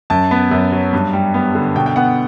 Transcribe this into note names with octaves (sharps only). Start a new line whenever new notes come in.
F#2 A5
B3
F#2
F#3
G2
G3
B3
D3
B2 G5
G5
B3 F#5